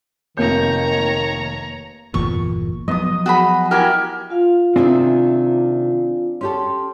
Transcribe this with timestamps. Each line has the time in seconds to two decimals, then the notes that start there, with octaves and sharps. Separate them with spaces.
0.38 F1 D#3 A#3 C#5 A#5 G6
2.14 G1 E2 A#2 C#6
2.88 F3 F#3 B3 D#5 D#6
3.26 F#4 G#4 B5
3.71 E4 F#4 G4 A#4 G5 G#5
4.30 F4 F5
4.76 C3 D#3 C4 D4 E4 G#4
6.41 C#4 G4 A4 C6